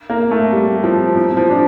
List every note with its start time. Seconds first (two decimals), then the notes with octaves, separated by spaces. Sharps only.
0.10 A#3
0.31 A3
0.53 G3
0.84 F3
1.16 F3
1.37 F3
1.49 D4